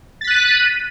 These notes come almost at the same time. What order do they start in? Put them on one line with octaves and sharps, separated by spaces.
A6 B6 F#6 D#7